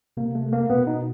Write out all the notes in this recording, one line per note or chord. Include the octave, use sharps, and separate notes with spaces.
C3 A#3
A3
A#3
B2 B3
D#4